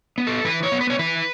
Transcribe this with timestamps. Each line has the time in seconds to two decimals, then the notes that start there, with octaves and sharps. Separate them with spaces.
0.18 B3
0.27 A4
0.45 E3 B4
0.63 C#5
0.72 B3
0.81 B4
0.90 C#5
0.99 E3 B4